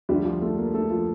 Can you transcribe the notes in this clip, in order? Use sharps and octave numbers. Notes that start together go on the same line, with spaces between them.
D2 D3 F3 G3 G4
F3 F4
A3 A4
A#3 A#4
A3 A4
F3 F4